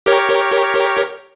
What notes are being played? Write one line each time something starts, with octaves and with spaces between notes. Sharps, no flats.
G4 A#4 C#5